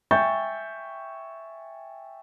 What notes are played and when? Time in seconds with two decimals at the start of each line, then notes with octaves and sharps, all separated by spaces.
0.11 E5 G5 G#5 C#6 G6 A6